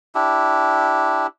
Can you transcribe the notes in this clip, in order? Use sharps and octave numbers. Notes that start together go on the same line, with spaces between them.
D4 E4 G4